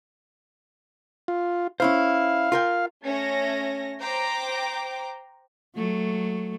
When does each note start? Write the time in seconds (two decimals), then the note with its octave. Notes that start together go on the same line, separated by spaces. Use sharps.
1.28 F4
1.80 C#4 E4 C5 F5
2.52 F4 A#4 G5
3.04 A3 C#4 A#6
4.00 C5 G5 A#5 D6
5.76 F#3 A3